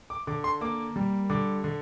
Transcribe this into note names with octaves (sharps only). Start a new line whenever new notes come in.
D6
D3 D6
C6
A#3 D6
G3
D3 D6
D3